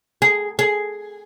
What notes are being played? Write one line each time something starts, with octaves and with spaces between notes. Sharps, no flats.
G#4
G#4